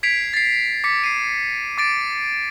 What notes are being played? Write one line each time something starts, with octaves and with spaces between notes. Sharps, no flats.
G#6 B6 C7 D7 F7
A6 C7
D6 B6 C#7
C7 D#7
D6 A6 D7